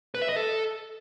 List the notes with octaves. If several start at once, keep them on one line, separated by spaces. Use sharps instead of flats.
B4
E5
D#5
A4